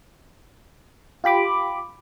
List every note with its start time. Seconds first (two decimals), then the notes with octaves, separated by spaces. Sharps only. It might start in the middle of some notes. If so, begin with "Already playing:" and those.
1.24 F4 G4 B5 D6